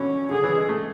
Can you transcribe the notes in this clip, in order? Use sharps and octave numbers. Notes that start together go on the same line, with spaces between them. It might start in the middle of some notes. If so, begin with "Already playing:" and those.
Already playing: B2 D3 E3 C#4
D3 G#4
E3
G#3
A3